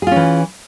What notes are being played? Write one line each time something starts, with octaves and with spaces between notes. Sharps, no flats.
E3 C#4 F4 G#4